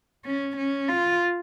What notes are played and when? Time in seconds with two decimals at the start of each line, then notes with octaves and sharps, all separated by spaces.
0.25 C#4
0.56 C#4
0.89 F4